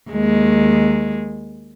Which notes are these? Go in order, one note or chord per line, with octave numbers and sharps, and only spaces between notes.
D#2 G#3